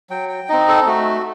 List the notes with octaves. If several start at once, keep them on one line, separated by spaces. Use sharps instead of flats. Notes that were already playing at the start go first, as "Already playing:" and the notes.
F#3 G5
G5
C4 D#4 D#5
A4
A3 F#4